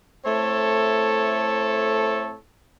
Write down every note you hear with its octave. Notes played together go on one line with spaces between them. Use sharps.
A3 C4 E4 A4 C#5